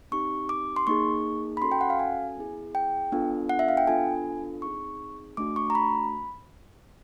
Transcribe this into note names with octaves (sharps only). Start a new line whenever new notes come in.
C4 D#4 G4 C#6
D6
C6
A#3 D#4 G#4 C#6
B5
C#4 F#4 A4 C6
G5
F#5
F5
G#5
B3 E4 G#4
G5
B3 D4 F4 A4
F#5
E5
F5
G5
B3 D4 F4 A4 G#5
C4 D#4 G#4 C#6
A3 D4 F#4 D6
C#6
A#5
B5